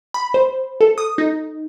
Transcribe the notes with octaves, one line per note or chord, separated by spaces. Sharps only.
B5
C5
A4
D#6
D#4